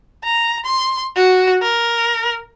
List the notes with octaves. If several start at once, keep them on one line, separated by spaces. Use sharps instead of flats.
A#5
C6
F#4
A#4